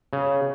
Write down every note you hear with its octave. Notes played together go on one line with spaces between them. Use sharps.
C#3